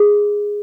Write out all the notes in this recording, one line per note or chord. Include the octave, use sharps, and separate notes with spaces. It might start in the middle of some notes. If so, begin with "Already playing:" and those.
Already playing: G#4